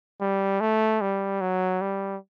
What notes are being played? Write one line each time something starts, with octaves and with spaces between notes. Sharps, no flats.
G3
A3
G3
F#3
G3